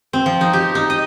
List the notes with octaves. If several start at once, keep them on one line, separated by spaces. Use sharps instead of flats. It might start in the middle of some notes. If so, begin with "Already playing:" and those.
C4
F3
D#4
G4
D#4
D#5